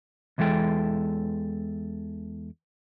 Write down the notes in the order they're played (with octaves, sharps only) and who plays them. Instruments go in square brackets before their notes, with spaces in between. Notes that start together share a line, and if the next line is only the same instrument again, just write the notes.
[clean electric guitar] E2 E3 G#3 A4 G5